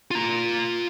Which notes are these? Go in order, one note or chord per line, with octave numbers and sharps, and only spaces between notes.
F4 A#5